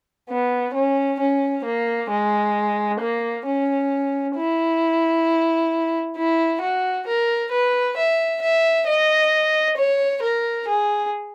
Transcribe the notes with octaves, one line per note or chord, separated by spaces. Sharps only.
B3
C#4
C#4
A#3
G#3
A#3
C#4
E4
E4
F#4
A#4
B4
E5
E5
D#5
C#5
A#4
G#4